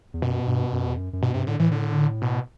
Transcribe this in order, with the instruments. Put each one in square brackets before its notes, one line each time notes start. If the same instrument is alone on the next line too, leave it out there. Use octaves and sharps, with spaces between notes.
[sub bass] E2
[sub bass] F#2 [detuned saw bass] B2
[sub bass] G2
F#2
E2
F#2
F#2
[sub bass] G2 [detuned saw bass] B2
[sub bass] G2 [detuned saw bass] C3
[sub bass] A2 [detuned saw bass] D3
[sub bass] A2 [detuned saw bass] E3
[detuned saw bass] D3
B2